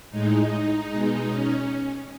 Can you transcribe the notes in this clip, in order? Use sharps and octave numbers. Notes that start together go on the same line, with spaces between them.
A2 G#3 D#4
D#4
B2 G#3
C#4